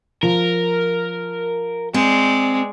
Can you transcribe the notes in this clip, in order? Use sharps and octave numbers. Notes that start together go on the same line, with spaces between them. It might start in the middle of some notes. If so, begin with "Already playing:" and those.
F3 A#4
G#3 C4 D5